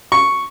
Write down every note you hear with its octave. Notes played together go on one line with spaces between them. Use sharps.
C#6